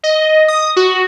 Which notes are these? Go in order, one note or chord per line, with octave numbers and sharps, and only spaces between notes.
D#5
D#6
F#4